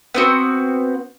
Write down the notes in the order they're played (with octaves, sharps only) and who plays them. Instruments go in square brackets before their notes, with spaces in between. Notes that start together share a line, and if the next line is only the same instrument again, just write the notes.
[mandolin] B3 C4 F#4